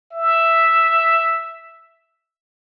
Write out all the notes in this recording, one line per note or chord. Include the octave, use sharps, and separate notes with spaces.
E5